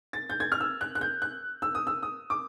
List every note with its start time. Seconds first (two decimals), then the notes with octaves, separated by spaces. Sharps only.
0.13 A6
0.30 G6
0.40 G#6
0.52 F6
0.60 E6
0.81 F#6
0.95 F#6
1.01 G6
1.22 F#6
1.62 E6
1.75 D#6
1.87 E6
2.03 D#6
2.30 D6